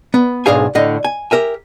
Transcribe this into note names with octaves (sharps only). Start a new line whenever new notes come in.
B3
B1 G#2 D4 G#4 F5 G#5
A2 D3 D#5
G#5
G4 A#4 E5 G#5